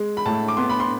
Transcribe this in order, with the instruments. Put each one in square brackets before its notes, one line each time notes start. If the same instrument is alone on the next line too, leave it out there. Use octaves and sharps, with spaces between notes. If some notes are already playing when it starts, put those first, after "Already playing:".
Already playing: [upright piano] G#3
[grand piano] B5
[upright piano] A2 [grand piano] A5
[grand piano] D6
[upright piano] B3 [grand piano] C6
[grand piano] B5
C6